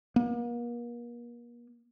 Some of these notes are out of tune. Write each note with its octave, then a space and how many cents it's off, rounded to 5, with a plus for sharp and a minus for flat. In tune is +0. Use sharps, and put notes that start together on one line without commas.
A#3 +40